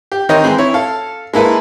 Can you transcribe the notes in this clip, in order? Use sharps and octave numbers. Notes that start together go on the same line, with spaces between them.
G4
D#3 C4 C#5 D#5 G5
E3 G#3 C4
E4 C#5
A4 F5
G#3 A#3 E4 A4 B4